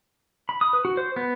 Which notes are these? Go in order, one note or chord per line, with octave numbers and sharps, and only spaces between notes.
B5
D#6
B4
F#4
C5
B3